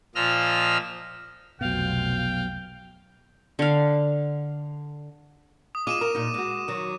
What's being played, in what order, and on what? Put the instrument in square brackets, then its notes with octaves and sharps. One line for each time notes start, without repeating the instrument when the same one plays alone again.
[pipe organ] A#2 F3 D#5 E6 F6
[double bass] F1 B1 [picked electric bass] B2 F#3 [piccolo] F5 [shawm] G5
[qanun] D3 F5
[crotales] D#6
[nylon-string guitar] F4 G#4 D#5 [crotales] D6 D#7 E7
[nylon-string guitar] A#4
A#2 D#4
G#3 F#4
D#3 F#3